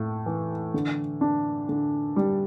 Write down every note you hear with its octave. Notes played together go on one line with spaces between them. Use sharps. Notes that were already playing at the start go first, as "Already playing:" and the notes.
Already playing: A2
E3
D3
D4
D3
G3